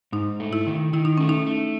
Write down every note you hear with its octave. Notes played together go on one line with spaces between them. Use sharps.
G#2 D#4
A3
E4
D#3
D#3 E4
D#4
A3 C#4
D#4
A3